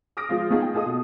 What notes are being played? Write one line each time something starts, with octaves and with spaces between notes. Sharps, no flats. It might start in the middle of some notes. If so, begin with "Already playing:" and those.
D6 D#6 F6 A#6 D7
F3 G#3 F4
A3 B3 D#4 F4 G#4
G5
F4 G#4 A4 D#5 D#6
B2